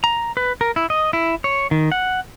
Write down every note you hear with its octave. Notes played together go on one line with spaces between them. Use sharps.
A#5
B4
A#4
E4
D#5
E4
C#5
D#3
F#5